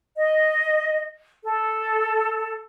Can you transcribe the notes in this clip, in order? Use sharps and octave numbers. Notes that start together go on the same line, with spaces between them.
D#5
A4